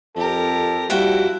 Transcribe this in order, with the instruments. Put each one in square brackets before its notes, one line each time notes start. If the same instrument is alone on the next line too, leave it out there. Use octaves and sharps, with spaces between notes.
[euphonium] F2 [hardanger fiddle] G4 A#4 [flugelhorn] A4
[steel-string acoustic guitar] F2 F#4 G5 [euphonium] G3 [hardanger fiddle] E4